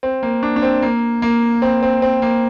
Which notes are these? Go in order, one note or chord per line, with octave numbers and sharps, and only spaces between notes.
C4
A#3
D4
D4
C4
A#3
A#3
C4
C4
C4
A#3